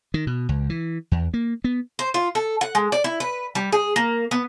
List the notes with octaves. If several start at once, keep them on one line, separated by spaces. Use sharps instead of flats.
D#3
B2
C#2
E3
E2
A#3
B3
C5
F4
A4
F#5
G#3
D5
E4
B4
G3
G#4
A#3
B3